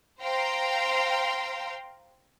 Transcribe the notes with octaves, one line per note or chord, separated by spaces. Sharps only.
C5 F5 G5 A#5 C6